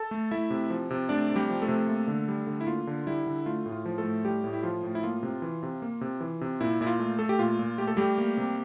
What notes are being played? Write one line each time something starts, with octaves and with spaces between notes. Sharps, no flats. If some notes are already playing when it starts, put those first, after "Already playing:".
Already playing: A4 A5
A3
A3 E4 E5
C3
F3
C3
A3 D4 D5
C3
G3 G4
F3
A3 A4
C3
A#3
D3
G3
D3
E4
A#3 F4
D3
G3 E4
D3
A3 F4
A2
F4
F3
A3 A4
A2
G3 A3 G4
A2
E4
F3 F4
A2
E4
A#3 F4
C3
E3
C3
A#3
C3
E3
C3
A#2 E4
A#2 E4
F4
A3
A3 A4
G4
A#2 F4
A#2
A3 G4
A4
G3 A3 G4
A#3
C3